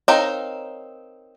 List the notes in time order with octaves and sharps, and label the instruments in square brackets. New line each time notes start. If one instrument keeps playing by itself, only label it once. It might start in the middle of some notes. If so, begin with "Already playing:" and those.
[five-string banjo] C4 D#4 A#4 [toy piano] C#5 F5 A#5